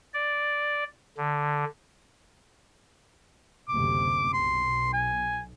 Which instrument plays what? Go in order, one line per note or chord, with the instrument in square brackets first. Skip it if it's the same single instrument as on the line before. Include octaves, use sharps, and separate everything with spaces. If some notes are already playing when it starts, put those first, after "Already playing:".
[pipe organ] D5
D3
[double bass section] F#1 D2 C3 [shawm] D6
[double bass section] B1 [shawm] C6
[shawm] G#5